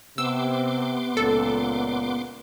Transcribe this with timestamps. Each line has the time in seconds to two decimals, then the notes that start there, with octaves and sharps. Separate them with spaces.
0.18 C3 B3 C6 D6 E6
1.17 C#2 A#2 A4